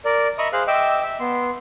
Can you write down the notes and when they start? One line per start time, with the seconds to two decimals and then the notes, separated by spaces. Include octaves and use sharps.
0.05 A#4 D5
0.38 D#5 E5 A#5 B5 C#6 D#6
0.53 G#4 C5 F5 F#6
0.68 D#5 E5 G5 D6 E6
1.02 E5
1.20 B3 C6